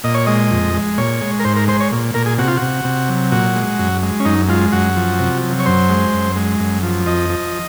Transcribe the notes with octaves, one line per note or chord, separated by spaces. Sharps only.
A#2 D#5
C#5
G#3 D#5
F2
G#3
A#2 C#5
G#3
A#4
G#2 C5
A#4
G#3 C5
C#5
A#2
A#2 A#4
G#4
C3 F#4
F4
C3 F#4
C3
F#3
A#2 F#4
G#3
F#2
G#3
C#4
F#2 D#4
G#3 F4
F#2 F#4
F3
C3
F#3
C#5
F#2 C5
G#3
F#2
G#3
F#2
F3
F2 D#5
F3